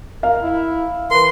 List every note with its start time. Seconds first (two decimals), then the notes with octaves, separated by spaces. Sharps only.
0.23 A#4 F5
0.42 E4
1.11 E3 A#4 B4 C6